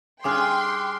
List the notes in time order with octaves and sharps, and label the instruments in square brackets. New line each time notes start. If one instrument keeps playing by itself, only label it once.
[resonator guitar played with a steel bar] G2 C#4 G#4 [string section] G5 C6 [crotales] D6 F6 F#6